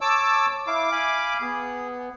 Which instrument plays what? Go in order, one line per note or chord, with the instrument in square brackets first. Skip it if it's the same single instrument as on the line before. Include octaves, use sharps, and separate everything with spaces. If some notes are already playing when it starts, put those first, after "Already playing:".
[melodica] C#5 [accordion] A5 D6 E6
[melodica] E4 F5 [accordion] D6
[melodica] F5 G#5 B5
[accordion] B3 [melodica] G#4